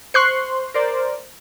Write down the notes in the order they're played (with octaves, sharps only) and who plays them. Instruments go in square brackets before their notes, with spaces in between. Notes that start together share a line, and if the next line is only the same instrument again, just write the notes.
[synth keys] C5 C6 [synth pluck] C#6 F#6 C7
[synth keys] A#4 C5 D5